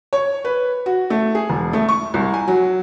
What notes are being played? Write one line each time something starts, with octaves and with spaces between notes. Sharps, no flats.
C#5
B4
F#4
A3
G#4
E1
A3
C#6
C2
G#5
F#3